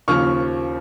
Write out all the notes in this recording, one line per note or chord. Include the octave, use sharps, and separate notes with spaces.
D#2 C#3 F3 C#6 F6